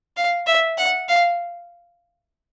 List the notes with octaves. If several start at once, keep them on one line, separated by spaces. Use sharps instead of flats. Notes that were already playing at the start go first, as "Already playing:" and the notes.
F5
E5
F#5
F5